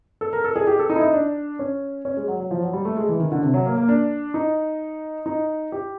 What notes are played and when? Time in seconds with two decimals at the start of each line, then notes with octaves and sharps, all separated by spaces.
0.21 A4
0.33 A#4
0.44 A4
0.56 G#4
0.67 G4
0.79 A4
0.90 D#4
0.96 E4
1.01 D#4
1.13 D4
1.59 C#4
2.05 C#4
2.17 G#3
2.28 F#3
2.40 F#3
2.51 F3
2.63 F#3
2.73 G3
2.85 A3
2.97 G#3
3.09 E3
3.19 D#3
3.32 D3
3.43 C3
3.54 F#3
3.66 A#3
3.77 A#3
3.88 D4
4.34 D#4
5.26 D#4
5.72 G4